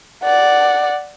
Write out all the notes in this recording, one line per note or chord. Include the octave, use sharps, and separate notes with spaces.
D5 F#5